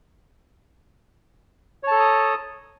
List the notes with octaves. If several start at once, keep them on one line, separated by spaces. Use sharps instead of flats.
A4 C#5 A5 A#5 D#6